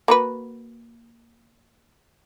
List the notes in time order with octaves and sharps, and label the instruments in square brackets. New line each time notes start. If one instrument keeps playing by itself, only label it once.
[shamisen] A#3 F#4 B4